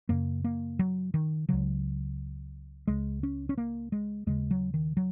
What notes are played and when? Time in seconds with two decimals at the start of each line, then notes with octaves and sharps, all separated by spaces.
0.09 F#2 C#3 A#3
0.44 A#3
0.79 F#3
1.14 D#3
1.49 C#2 C#3 F#3
2.87 C#2 C#3 G#3
3.23 C#4
3.49 C#4
3.58 A#3
3.92 G#3
4.27 D#2 C#3 G#3
4.51 F#3
4.74 D#3
4.97 F#3